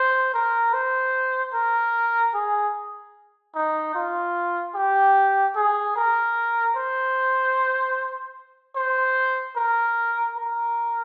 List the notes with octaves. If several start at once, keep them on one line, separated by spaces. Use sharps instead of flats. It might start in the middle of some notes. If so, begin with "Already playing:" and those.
Already playing: C5
A#4
C5
A#4
G#4
D#4
F4
G4
G#4
A#4
C5
C5
A#4
A#4